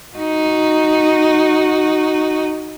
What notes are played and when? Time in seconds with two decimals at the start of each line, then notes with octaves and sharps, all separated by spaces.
0.16 D#4 F#4